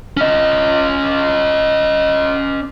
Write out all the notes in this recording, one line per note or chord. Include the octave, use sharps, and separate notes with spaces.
C#4 D#5